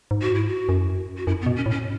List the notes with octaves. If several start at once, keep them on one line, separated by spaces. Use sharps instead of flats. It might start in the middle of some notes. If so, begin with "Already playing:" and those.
G#2
F#4
E4
F#4
F#2
F#4
F#2 E4
B3
B2
C#4
A2
C#4